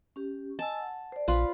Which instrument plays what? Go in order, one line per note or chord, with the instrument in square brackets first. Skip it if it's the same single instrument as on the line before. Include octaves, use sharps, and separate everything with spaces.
[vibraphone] C#4 G4
[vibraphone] D#5 G#5 E6 [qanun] A5
[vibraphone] F#5
C5 D5
[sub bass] A#1 [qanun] F4 B4